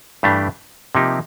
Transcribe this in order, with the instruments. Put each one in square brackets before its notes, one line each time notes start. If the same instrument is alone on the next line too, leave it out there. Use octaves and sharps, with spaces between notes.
[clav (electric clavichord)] G2 E3 A3 D4 G4
C3 F3 A#3 D#4 G4